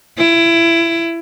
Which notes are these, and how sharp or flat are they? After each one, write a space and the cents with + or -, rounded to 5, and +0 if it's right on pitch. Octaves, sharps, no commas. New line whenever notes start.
E4 +20